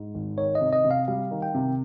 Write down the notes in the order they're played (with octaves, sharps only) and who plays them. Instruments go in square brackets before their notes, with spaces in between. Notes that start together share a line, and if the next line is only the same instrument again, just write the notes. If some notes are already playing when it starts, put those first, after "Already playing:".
Already playing: [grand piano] G#2
G#1
[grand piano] D#3 [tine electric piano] C#5
[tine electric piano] D#5
[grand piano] C3
[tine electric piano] D#5
[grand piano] C3
[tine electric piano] F5
[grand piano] G3 [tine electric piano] F5
[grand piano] D#3
[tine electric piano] G5
[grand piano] C3